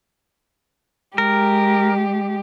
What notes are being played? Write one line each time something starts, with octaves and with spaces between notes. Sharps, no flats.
G#3 G4 A#4